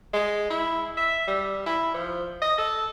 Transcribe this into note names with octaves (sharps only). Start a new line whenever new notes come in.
G#3
E4
E5
G3
E4
F3
D#5
A4